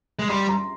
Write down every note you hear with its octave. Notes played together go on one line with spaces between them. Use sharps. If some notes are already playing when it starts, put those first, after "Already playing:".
G#3
G3 C6
A#5